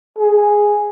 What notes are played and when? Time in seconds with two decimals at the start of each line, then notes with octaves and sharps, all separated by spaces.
0.18 G#4